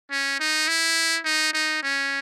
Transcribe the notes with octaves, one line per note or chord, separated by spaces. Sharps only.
C#4
D#4
E4
D#4
D#4
C#4